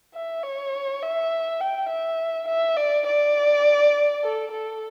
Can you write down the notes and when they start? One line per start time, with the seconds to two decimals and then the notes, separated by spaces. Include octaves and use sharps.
0.15 E5
0.43 C#5
1.02 E5
1.61 G5
1.89 E5
2.48 E5
2.77 D5
3.07 D5
4.23 A4
4.51 A4